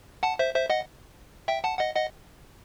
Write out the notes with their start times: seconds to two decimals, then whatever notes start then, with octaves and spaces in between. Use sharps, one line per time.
0.23 F#5 A5
0.39 C5 E5
0.55 C5 E5
0.70 D#5 F#5
1.48 E5 G5
1.64 F#5 A5
1.79 D#5 F#5
1.95 D#5 F#5